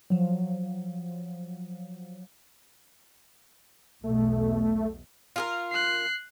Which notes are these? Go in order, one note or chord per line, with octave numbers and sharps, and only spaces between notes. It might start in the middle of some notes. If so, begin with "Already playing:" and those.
F3 F#3
B1 E2 B2 A3
F4 G#4 A#4
F#6 C7